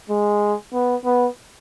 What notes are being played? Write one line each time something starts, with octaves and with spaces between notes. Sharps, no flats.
G#3
B3
B3